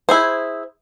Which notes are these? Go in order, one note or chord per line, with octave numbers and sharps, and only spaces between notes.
E4 G#4 C5